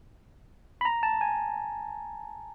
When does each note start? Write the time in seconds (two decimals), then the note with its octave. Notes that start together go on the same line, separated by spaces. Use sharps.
0.81 B5
0.85 A#5
1.03 A5
1.21 G#5